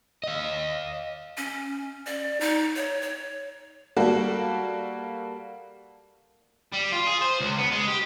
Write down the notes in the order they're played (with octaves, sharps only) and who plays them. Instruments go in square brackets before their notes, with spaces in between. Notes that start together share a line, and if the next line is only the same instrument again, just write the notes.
[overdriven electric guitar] D#5 F5
[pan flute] C#4
D5
D#4
C#5
C#5
[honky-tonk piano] G3 A#3 F#4 A4
[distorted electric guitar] G3
F4
G#4
C5
C#2
B3
G#3
G4